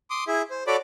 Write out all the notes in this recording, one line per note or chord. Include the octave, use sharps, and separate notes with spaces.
C6 D6 D#6
E4 G#4 E5
C5
F#4 A4 C#5 D5 B5 D6